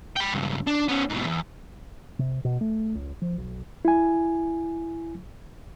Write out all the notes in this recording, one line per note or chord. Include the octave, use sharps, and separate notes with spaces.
G5 B5
C#2 G2
D4
B3 C#4
G#2 B2
E2
C3
B2
A3
C#2
F3
B1
E4 G#5